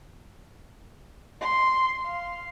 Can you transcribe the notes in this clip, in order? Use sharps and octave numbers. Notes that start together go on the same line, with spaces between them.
C6
F5